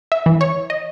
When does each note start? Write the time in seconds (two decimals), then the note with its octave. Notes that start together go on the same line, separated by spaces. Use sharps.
0.12 E5
0.26 E3
0.41 C#5
0.70 D#5